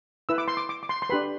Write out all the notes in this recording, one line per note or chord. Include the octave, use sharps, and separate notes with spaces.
E4 B4 E6
D6
C6
D6
D6
D6
C6
C6
D4 G4 B4 B5